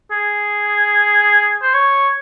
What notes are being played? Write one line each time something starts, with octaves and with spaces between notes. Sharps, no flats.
G#4
C5
C#5